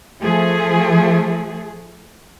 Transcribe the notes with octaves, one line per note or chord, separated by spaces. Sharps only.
F3 A3 G#4